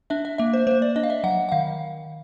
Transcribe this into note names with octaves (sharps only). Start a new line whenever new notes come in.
D4 E5
E5
A#3 E5
C5
A#3 C5
D5
D4 D#5
F5
E5
F#3 F#5
F#5
D#3 F5